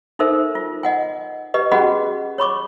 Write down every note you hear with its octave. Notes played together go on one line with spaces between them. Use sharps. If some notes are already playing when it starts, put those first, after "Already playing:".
D#4 A4 A#4 C5 E5
F4
D#5 F#5 G#5
G4 B4 D#5
C#4 F#4 G#4 D#5 F#5 B5
C#5 B5 C#6 D6